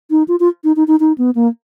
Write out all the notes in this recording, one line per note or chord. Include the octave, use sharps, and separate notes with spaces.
D#4
F4
F4
D#4
D#4
D#4
D#4
B3
A#3